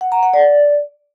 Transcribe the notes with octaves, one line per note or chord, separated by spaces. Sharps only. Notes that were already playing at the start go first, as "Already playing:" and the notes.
F#5
A#5
F#5
D5